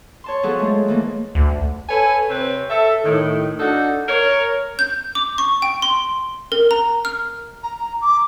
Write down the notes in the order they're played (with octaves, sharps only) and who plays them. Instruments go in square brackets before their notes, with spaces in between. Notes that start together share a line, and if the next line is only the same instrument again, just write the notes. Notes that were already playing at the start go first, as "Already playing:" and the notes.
[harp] C#5 A5 C6
F3 F#3 B3 F4 G#4 A4
G#3 A3
E3 A3 A#3
[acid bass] D2
[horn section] A4 B4 C#5 G#5
C3 C4 B4 C#5
A4 E5
A2 D#3
D4 D#4 F#4 A4
A#4 C#5
[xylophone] G6
D6
C#6
G5
C6
A#4
A#5
F6
[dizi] A#5
D6